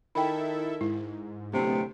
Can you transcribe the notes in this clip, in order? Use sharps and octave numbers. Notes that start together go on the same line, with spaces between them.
D#3 E4 A4 E5 G5 B5
G#2 E4
D1 C3 A3 B3